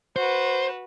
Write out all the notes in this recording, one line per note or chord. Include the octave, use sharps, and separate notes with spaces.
F#4 B4 C5